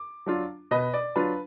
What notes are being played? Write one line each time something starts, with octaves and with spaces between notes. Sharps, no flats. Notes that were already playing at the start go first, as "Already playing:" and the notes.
Already playing: D6
F#3 D4 F4
B2 B4 D#5
D5
F#3 D4 F4 B4